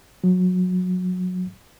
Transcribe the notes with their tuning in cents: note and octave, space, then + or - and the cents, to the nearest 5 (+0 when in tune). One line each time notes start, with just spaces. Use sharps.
F#3 -25